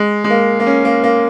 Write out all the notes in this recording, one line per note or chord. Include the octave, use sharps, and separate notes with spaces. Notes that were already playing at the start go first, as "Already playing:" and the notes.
Already playing: G#3
G#3
A#3
A#3
C#4
A#3
A#3